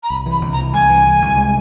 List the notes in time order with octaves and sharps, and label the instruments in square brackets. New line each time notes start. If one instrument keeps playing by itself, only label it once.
[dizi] A#5
[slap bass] C2 [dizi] B5
[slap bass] E3 [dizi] B5
[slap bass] C2
[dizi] A#5
[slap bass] E3
[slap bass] C2 [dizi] G#5
[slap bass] E3
C2
C2
G#3